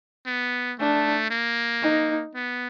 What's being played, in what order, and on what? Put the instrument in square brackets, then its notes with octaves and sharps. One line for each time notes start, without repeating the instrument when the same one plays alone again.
[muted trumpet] B3
[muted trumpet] A3 [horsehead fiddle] D4
[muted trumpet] A#3
[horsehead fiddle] D#4
[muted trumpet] B3